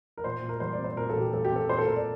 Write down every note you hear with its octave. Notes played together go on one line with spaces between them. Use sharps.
A#4
A#2 C5
A#2
A#4
G3 C5
D5
C4
C5
A#2 A#4
A4
A#2
G4
G3 A4
G4
C4 A4
A#2 C5
A4
A#2 A#4
D5